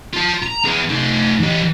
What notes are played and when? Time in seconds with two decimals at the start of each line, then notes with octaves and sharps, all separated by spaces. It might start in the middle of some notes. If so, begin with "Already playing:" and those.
0.13 F4 A5
0.42 A#5
0.65 B3 G#4
0.89 A3 D#4
1.40 E3 G4